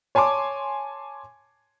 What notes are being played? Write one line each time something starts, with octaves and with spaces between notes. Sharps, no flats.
C#5 G#5 A5 C6 D6